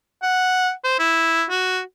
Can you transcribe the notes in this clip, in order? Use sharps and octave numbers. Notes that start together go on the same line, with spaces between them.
F#5
C5
E4
F#4